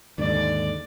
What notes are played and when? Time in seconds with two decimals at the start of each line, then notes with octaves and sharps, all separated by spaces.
0.18 D#2 G#2 D3 D5